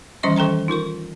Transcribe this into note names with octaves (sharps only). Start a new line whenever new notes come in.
D#3 E3 G3 C#4 D#5 C#6
D#3 A4 G5 A#5 C6
D#4 F4 A#4 C#6